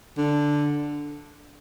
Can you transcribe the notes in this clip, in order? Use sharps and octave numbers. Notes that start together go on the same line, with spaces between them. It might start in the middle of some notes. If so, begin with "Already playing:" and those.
D3